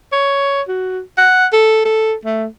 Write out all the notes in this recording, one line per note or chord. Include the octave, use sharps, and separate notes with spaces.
C#5
F#4
F#5
A4
A4
A3